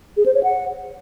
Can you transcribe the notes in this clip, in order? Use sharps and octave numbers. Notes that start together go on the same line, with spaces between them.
G#4
C5
C#5
F#5